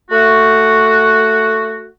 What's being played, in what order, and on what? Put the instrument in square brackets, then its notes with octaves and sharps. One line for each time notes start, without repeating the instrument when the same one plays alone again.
[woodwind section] A3 F#4